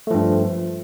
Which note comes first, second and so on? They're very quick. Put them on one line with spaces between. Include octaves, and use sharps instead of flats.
A3 F3 G2